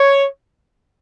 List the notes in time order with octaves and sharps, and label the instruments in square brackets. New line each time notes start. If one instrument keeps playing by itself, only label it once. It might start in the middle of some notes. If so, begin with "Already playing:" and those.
Already playing: [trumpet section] C#5